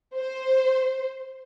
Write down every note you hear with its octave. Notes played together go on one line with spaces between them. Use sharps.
C5